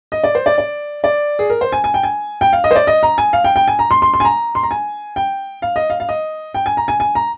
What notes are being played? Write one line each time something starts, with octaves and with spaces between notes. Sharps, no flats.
D#5
D5
C5
D5
D5
D5
G#4
A#4
C5
G#5
G#5
G5
G#5
G5
F5
D#5
C5
D5
D#5
A#5
G#5
F5
G5
G5
G#5
A#5
C6
C6
C6
G#5
A#5
C6
A#5
G#5
G5
F5
D#5
F5
F5
D#5
G5
G#5
A#5
G#5
G#5
A#5